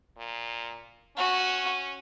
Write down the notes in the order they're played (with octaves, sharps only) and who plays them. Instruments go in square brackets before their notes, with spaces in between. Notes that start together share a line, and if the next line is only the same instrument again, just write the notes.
[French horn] A#2
[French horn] C#4 [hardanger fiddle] F#4